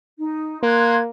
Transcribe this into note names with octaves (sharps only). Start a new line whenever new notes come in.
D#4
A#3 C6 F#6 G#6